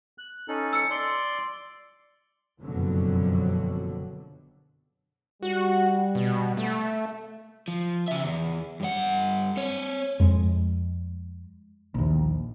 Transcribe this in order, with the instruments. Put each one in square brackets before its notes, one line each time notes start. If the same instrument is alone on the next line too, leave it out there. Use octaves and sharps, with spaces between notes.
[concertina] F#6
C#4 D#4 A4
[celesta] E6 C#7
[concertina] D5 C6
[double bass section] F#1 F2 B2 D3 F#3
[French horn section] G3 [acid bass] F#4
[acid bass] B2
A3
[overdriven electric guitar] F3
C#3 E5
E2
G2 F#5
C4 C#5
[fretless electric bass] F2 G#3
A#1 D#2